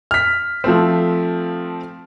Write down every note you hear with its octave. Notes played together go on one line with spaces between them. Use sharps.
F6 B6
F3 A3 C4